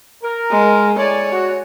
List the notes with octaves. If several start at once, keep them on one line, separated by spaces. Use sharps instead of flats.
A#4
G#3
A2 C#5 D5 G#5
F#4